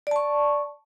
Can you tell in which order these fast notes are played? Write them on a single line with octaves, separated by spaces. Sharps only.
D5 A5 C#6